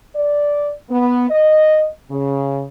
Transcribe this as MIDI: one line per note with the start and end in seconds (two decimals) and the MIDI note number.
0.15 0.72 74
0.90 1.27 59
1.30 1.88 75
2.11 2.65 49